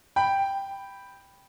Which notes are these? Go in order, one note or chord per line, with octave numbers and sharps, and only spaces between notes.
G5 B5